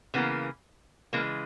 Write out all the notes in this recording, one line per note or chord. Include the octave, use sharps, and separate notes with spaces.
C#3 E3 A#3 B3
C#3 E3 G#3 A#3